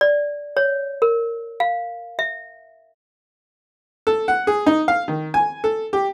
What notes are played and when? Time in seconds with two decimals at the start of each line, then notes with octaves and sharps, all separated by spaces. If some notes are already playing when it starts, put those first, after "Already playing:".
0.01 D5
0.57 C#5
1.02 A#4
1.60 F5
2.19 E5
4.07 A4
4.28 F#5
4.47 G#4
4.66 D#4
4.88 F5
5.08 D#3
5.34 G#5
5.64 A4
5.93 G4